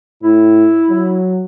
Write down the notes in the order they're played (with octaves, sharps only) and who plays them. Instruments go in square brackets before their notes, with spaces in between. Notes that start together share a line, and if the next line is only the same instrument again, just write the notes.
[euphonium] A2 [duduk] E4
[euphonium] F#3